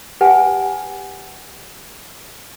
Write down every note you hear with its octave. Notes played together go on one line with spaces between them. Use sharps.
G4 B4 F#5 G#5 A5